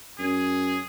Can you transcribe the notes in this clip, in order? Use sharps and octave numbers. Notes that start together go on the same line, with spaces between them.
F#2 G#4